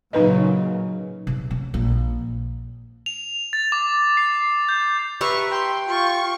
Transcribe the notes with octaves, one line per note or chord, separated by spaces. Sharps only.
A#2 C#3 F#3 D#4 B4 D#5
C3
C#4
A#1
F7
A6
D6
C7
G6
G4 B4 E5 A#5 C#6
G5 C6
F4 C#6